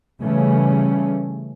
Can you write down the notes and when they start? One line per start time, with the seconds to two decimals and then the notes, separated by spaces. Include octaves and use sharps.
0.20 C#3 E3 G3 A3 C#4